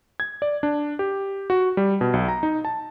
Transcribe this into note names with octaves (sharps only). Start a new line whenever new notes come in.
G#6
D5
D4
G4
F#4
G3
B2
B1
A#5
D#4
A5